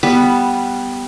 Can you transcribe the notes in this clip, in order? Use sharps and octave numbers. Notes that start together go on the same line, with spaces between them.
G3 B3 B4